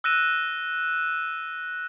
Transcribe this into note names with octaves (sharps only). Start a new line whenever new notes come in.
E6 F#6 A#6 D#7 E7